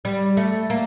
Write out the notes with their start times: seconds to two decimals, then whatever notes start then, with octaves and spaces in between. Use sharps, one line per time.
0.05 G3
0.37 A3
0.70 A#3